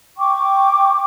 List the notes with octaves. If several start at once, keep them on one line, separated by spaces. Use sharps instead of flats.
G5 C#6 D6